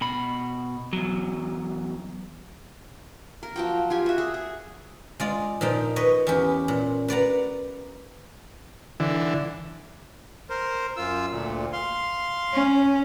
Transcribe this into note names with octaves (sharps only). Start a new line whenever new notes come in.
B2 B5
E2 F#3
A#4
F3 F#3 G5
F4 G4 G#5
F#4 E5
G#4
G#4
G#3 F4 D5
A#2 F3 D#4 G5
B4 C#5 D#5
E2 C#4 G4
A#2
B4 D5 F#5 A#5
D3 E3
A#4 C5
F#2 F4 E6
D2 A#2
F5 C6
C#4